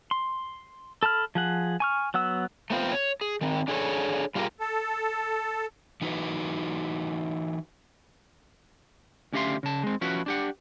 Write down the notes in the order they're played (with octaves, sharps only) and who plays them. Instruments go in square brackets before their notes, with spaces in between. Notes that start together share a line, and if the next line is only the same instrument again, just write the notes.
[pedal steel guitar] C6
A4 A5 B5 F6
F3 G#4 F#5
G#5 C#6 F6
F#3 B3 F#5 E6
[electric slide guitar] A3 B3 C4 F4 C5
C#5
G#4
D#3 C4
D4 G#4 A4 C#5
G3 F4 G4 G#4 A#4
[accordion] A4
[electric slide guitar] E3 D#4 F#4 B4
[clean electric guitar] D2 C#4 G4 E5 F5 C6
C#3 A5
G#3 C4
F3 C#4 E4 F#4 B4
D4 G4 F#5